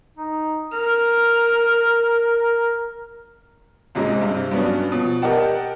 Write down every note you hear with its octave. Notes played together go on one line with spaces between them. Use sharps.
D#4
A#4 F6
C#2 G#2 C3 G#3
G2 C3
G2 F#3 B3 C#4 D4
B2 F3
G4 A#4 D5 D#5 F#5 A5